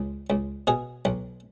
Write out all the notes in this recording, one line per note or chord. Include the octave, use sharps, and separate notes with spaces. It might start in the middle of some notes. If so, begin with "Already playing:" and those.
Already playing: C#2
C#2
B2 G#4
B1